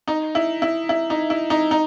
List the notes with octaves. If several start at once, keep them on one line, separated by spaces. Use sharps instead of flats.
D#4
E4
E4
E4
D#4
E4
D#4
D#4